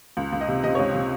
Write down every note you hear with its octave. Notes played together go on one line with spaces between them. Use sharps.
C#2
C#2
D#5
C3
C3 D#5
C#2 C#5
C3